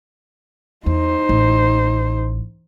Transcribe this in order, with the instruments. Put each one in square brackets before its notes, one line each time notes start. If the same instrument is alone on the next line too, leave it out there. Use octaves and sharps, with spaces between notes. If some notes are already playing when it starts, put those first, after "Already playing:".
[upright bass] E2 [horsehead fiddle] D#4 C5
[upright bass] A1